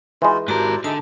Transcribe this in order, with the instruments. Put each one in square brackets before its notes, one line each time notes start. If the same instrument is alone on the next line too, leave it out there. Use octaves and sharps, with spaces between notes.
[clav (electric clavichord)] E3 G#3 [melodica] D#4 F4 F#4
[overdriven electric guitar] G#2 A#4 [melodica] E4 C5 D5 [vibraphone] F#4 G4 A5
[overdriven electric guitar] D3 [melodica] D#4 G#4 E5 [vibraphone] A5